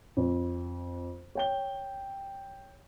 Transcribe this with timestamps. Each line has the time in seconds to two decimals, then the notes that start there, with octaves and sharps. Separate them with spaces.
0.17 F2
1.35 C#5 G5 G7